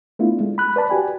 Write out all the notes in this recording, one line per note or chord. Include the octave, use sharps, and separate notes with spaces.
A3 B3 D4 E4 F4
G#3
B5 F#6
B4 D5 A5 B5
F#4 G4 G#5